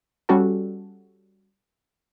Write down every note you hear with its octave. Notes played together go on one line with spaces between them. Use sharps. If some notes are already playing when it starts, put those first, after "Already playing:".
G3 C#4 F#4 A4